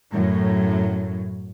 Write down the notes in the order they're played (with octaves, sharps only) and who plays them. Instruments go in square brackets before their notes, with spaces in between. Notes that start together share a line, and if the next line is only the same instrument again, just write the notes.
[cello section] F#2 A2 F#3